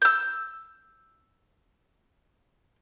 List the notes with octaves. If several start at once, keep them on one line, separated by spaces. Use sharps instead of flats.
E6 G6